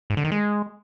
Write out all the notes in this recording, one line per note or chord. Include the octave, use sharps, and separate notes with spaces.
G#2
D3
D#3
G#3